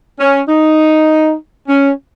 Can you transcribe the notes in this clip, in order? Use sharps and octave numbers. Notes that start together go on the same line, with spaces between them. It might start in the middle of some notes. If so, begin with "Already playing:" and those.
C#4
D#4
C#4